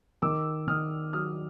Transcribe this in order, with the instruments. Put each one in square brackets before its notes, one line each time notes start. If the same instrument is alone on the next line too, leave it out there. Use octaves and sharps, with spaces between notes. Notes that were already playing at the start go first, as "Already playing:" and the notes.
[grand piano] D#3 D6 E6
D#3 D#6 F6
F#3 D#6 F6